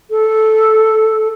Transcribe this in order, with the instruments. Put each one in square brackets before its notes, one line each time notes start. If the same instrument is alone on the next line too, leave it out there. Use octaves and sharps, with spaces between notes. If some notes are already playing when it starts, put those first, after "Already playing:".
[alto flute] A4